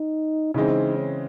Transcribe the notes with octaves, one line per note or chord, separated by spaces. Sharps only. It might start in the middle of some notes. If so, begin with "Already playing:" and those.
Already playing: D#4
C#3 E3 G#3 C4 D#4
C#4